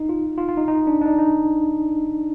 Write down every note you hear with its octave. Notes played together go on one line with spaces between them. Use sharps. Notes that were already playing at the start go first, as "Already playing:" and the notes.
Already playing: D#4
F4
F4
F4
D#4
D#4
D4
D4
D#4
D#4